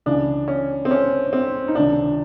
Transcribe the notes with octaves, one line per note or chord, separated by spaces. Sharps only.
C#2 C#3 E3 D4
C#4
C4
C#4
C4
D#4
C#2 C3 D#3 D4